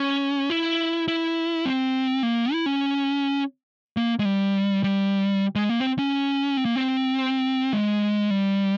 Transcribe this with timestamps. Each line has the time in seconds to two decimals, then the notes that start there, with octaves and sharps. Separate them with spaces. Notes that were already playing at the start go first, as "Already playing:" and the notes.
Already playing: C#4
0.50 E4
1.08 E4
1.65 C4
2.23 A#3
2.53 E4
2.66 C#4
3.97 A#3
4.20 G#3
4.25 G3
4.84 G3
5.55 G#3
5.70 A#3
5.80 C4
5.98 C#4
6.57 C4
6.65 A#3
6.76 C4
7.73 G#3
8.30 G3